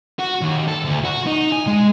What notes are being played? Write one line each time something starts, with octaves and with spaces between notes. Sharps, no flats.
F#4
D#2
A4
D2
F#4
D#4
G#5
G#3